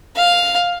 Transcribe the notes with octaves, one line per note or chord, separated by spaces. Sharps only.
F5